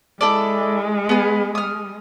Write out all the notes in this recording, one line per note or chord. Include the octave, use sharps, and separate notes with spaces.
G#3 E4 A4 D5
B3 G#4
D#6 F6